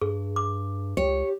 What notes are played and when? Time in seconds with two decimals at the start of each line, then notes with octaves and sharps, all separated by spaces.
0.01 G2 G#4
0.36 D6
0.97 C#2 G4 C#5